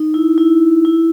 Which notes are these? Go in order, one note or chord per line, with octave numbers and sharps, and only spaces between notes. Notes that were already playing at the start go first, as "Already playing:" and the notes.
Already playing: D#4
E4
E4
E4